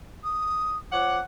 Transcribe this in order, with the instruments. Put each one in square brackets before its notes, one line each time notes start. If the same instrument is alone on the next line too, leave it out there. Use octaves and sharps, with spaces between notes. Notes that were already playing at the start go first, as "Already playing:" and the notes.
[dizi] D#6
[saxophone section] F3 C#5 F#5 [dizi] D6